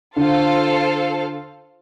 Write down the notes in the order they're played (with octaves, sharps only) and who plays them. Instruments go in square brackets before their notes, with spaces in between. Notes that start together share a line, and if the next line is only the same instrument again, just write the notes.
[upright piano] D3 [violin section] F4 A4 C5 F5